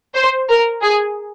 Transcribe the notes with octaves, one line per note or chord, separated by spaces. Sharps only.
C5
A#4
G#4